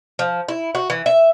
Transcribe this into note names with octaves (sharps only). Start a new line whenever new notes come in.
F3
E4
F#4
E3
E5